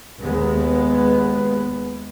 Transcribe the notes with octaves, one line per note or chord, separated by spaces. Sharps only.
D#2 G#3 B3